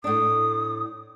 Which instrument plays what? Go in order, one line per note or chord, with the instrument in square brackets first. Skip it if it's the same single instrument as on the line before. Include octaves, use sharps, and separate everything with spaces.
[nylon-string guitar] A2 D4 [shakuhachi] D#6